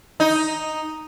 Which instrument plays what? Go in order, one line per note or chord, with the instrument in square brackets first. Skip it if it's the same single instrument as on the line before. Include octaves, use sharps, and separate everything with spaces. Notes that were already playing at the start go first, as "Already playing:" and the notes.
[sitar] D#4